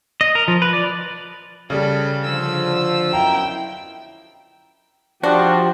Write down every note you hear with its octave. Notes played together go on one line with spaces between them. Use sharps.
D#5
A#4
F3
B4
D5
C#3 G3 A4
D3 F3 E6
F#2 B2 E4 G5 A#5
F3 D4 F#4 G4